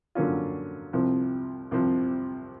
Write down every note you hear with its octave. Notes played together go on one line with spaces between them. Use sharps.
D3 F#3 A#3 C#4 F4
C2 C3 F3
C2 C3 F3